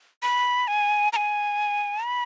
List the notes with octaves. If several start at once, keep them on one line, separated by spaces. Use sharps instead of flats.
B5
G#5
A#5
G#5
B5